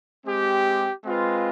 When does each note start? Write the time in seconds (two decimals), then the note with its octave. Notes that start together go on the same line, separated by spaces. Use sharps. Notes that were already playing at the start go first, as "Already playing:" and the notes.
0.25 G#3 C4 G4
1.04 G#3 C4 F4 B4